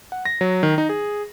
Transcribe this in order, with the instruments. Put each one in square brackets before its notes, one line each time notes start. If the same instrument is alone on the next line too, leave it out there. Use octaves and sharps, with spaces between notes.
[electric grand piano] F#5
A#6
F#3
D#3
D#4
G#4